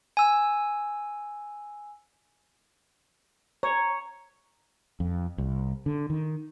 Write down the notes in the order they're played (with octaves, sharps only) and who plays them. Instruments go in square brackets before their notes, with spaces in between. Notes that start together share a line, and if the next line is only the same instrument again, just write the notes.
[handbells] G#5 E6
[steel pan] C#5 [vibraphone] A#5
[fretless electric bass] F2
C2
D3
D#3